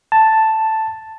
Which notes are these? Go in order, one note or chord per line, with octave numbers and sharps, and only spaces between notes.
A5